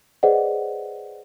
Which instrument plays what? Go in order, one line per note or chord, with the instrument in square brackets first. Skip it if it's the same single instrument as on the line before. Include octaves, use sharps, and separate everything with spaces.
[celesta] G#4 B4 C5 D5 D#5 F#5